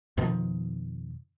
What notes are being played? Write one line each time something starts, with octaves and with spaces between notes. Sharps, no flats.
F2 B2 D#3 F3